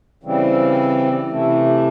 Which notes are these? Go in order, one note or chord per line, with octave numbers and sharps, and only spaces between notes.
C#3 E3 G3 C4
C3 E3 A3